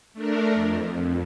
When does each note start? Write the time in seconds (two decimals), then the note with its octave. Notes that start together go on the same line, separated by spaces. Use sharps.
0.13 A3 D4 A#4
0.54 F2